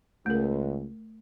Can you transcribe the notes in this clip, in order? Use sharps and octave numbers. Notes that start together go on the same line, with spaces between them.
C#2 A3 A#4